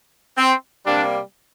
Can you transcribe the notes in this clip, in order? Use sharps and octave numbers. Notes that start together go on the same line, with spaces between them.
C4
C3 G3 A#3 D4